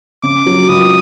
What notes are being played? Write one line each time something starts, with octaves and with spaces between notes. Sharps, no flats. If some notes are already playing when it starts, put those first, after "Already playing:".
C#3 D6
F#3
C#2 D#6